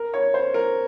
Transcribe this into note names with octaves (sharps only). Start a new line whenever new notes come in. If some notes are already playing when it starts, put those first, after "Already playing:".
Already playing: A#4
C#5
C5
A#4